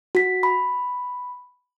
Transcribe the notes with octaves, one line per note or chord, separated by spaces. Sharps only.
F#4 B6
B5